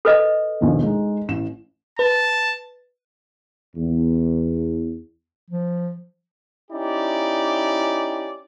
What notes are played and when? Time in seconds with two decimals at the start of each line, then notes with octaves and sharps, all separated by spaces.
0.05 A4 B4 D#5
0.61 A#1 D#2 B2
0.82 G#3 D#4
1.28 A1 E7
1.99 B4 A5
3.76 E2
5.50 F3
6.71 C#4 D#4 E4 G4 D5